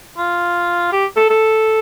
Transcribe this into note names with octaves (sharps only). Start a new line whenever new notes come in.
F4
G4
A4
A4